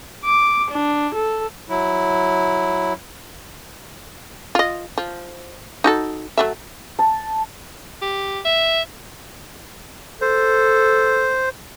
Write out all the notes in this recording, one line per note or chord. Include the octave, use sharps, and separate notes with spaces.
D6
D4
A4
F#3 E4
F4 D#5
F3
D#4 F#4 A4
F#3 A3 E5
A5
G4
E5
A4 C5